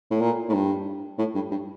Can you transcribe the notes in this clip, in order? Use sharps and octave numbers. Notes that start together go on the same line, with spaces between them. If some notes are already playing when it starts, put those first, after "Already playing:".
A2
A#2
A2
G2
A2
G2
G2